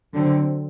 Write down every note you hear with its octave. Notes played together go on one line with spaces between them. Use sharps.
D3 F#3 C4